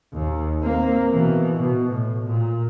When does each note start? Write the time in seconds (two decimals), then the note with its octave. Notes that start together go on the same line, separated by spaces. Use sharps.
0.13 D#2
0.62 A#3 C4
1.10 B2 E3
1.55 B2
1.91 A2
2.27 A#2